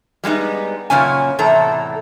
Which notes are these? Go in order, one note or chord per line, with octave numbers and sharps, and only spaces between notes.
G3 G#3 B3 D#4
F#2 A#2 C#3 C#4 G#5
E2 A2 C3 A4 A#5